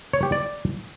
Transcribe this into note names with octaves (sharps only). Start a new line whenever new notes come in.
C#5
G4
D5